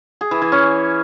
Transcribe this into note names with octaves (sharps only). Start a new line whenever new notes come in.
G#4
E3
E3
C#4